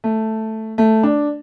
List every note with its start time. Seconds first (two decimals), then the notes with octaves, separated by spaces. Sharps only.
0.04 A3
0.78 A3
1.03 D4